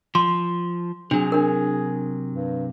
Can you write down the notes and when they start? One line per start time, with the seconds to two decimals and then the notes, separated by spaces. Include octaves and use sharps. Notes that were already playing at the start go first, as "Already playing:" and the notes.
0.15 F3 C6
1.11 C3 F#3 D4 G#4
1.32 D4 A#4
2.32 G2